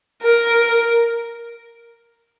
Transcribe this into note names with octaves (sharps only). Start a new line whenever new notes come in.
A#4